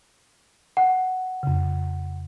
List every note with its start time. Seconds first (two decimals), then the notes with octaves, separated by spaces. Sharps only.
0.77 F#5
1.43 F2 C#3